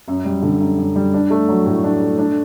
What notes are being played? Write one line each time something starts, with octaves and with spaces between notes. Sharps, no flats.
F#2
G3
D3
F#2
F#2
G3
D4
A3
F#3
A2
D4
A3
D4